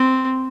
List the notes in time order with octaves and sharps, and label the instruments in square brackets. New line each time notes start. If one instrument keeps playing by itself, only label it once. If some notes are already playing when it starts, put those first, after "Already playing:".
Already playing: [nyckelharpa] C4